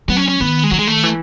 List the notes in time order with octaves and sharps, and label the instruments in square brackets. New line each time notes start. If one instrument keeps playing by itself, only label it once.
[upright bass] F#3 [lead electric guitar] B3
[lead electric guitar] C#4
C#4
[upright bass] D#3 [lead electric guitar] B3
[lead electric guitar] G#3
[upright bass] D#3 [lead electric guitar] F#3
[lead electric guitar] G#3
A3
[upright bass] E3